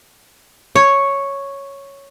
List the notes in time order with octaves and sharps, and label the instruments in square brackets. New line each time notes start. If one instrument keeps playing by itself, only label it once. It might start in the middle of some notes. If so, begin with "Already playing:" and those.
[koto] C#5